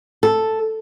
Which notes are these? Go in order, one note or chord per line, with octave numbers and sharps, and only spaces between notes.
A4